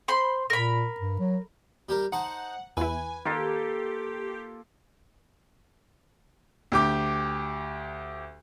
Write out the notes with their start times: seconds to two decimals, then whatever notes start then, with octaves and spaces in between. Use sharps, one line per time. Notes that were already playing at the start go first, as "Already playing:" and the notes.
0.08 C5 B5 C6
0.50 A#2 A#4 B5
1.00 G2
1.19 F#3
1.89 G3 G4 A#4
2.12 D#4 C5 F#5 A5
2.77 E2 E4 B4 G#5
3.25 D#3 A#3 F4 G4 A4
6.72 D2 G4 D6